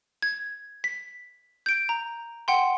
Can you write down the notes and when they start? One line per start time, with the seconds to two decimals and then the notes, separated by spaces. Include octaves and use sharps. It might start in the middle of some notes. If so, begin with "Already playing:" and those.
0.22 G#6
0.84 B6
1.66 G6 D7
1.89 A#5
2.48 F#5 G5 C6